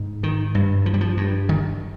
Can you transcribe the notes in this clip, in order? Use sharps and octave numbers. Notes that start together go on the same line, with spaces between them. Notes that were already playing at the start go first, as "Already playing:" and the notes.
Already playing: G#2
D#3
G2
F3
G3
F3
G2
D#3